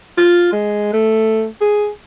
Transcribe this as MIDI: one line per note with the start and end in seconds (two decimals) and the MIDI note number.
0.18 0.50 65
0.53 0.92 56
0.93 1.45 57
1.61 1.89 68